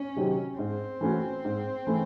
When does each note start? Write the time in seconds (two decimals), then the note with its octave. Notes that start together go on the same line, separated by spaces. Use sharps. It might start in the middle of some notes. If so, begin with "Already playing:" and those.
Already playing: C#4
0.16 C3 D#3 F#3 C4
0.58 G#2 C4
1.01 E3 A3 C#4 F#4
1.45 G#2
1.87 E3 A3 C#4